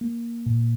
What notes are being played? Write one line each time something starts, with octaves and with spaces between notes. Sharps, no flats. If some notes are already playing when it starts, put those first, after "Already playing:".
A#3
A#2